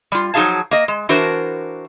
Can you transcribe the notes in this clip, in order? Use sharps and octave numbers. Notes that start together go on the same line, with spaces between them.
G3 F4
F3 F#3 D#4 G#4 F5 A5
A#3 D#5
G#3
E3 D4 F#4 A#4 C5